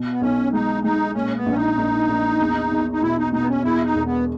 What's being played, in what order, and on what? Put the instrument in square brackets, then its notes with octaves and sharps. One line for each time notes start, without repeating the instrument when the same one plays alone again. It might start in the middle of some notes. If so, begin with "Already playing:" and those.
Already playing: [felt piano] B2
[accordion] B3
[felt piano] B1 [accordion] C#4
[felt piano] G#3 [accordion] D#4
[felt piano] G#3 [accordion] D#4
[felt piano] A#2 [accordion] C#4
[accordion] B3
[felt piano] A#1 [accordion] C#4
[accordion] D#4
[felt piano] A#1
A#1
E2
E2
[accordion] D#4
[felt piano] B2 [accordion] E4
[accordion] D#4
[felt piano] B2 [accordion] D#4
[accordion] B3
C#4
[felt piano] E2 [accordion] E4
[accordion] D#4
[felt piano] E1
[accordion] B3